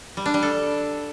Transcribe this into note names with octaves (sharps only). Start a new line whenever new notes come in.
G3
D4
G3
A4